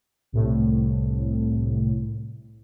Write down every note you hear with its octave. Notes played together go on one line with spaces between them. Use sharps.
C2 A2